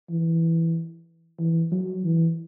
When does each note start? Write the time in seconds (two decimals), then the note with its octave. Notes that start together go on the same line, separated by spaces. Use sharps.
0.09 E3
1.39 E3
1.71 F#3
2.04 E3